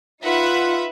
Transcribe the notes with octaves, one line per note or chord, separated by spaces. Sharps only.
D#4 F4 B4 E5 F#5 B5